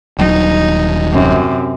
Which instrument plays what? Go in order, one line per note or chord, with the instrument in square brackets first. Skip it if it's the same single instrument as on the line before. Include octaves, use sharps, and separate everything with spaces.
[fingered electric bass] D#1 F#3 [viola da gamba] D#4
[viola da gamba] F#2 C3